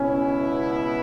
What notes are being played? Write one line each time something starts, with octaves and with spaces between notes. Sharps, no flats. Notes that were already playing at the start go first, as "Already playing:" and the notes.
Already playing: C#2 B2 B3 C#4 E4